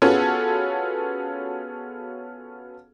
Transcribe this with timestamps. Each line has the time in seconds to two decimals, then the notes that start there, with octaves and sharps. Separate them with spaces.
0.02 B3 C#4 F4 F#4 G#4 A4